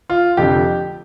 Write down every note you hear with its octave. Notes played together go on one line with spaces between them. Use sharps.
F4
F1 F2 D3 F3 G4